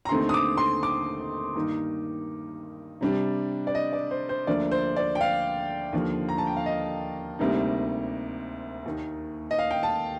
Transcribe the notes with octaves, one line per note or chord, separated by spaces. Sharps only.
A#5
D#2 D3 A3 C4 D#4 C6
D#6
D6
C6
D6
G2 D#3 A#3 D#4
C3 G3 D4
D5
D#5
D5
C5
C5
D2 D3 F3 A#3 D5
C5
D5
G5
F5
D#2 D3 F3
A#5
A5
G5
F5
D#5
D2 C3 G3 A#3 D#4
D#2 D#3 A#3 D#4
D#5
F5
G5
A5